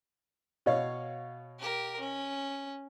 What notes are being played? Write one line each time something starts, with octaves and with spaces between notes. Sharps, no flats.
B2 C#5 F5
G4 A#4
C#4